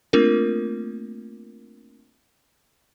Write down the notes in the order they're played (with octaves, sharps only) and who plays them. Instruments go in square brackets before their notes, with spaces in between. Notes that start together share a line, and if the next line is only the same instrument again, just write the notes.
[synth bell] A3 A#3 C4 D4 F4 A#4